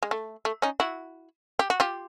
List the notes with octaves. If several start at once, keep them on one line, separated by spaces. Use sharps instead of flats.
G#3
A3
A3
C#4 D#4
E4 F#4
G4
F#4
F4 G4